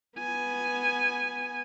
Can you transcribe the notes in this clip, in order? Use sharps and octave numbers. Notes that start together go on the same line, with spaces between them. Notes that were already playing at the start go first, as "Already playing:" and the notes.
B3 G#5